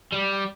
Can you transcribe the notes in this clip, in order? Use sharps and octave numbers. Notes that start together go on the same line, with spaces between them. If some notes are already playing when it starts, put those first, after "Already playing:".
G3